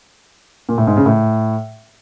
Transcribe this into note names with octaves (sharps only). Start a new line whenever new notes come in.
A#2
A2
G#2
C#3
A2